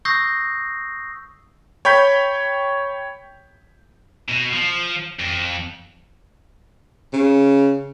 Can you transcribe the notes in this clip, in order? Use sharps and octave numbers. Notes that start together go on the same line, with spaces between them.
C#6 D#6 E6 G6 A#6 C7
C#5 G5 B5 G6 B6
B2
F3
F2
C#3